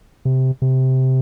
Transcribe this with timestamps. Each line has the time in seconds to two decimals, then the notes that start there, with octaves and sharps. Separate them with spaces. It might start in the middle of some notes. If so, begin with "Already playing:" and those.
0.25 C3
0.62 C3